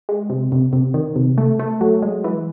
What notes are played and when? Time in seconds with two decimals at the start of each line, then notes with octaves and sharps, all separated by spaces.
0.09 G#3
0.29 C3
0.52 C3
0.73 C3
0.94 D#3
1.16 C3
1.38 A3
1.59 A3
1.81 F#3
2.02 G#3
2.24 E3